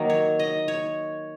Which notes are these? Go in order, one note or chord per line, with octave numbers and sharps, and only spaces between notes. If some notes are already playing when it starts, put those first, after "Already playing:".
Already playing: D#3 F#3 A#3 D#4 D#5
C#5
D#5
C#5